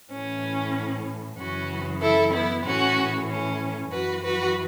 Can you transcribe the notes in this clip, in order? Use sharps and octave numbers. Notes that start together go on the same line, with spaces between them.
A2 E3 C#4
F#2 C#3 E3 C#4 F#4
E4 A4
B3 E4
A2 E3 C#4 F#4
C#4
F#2 E3 F#4 B4
F#4 B4